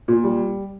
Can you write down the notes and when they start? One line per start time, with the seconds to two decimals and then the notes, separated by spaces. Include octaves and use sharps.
0.08 A#2
0.24 G3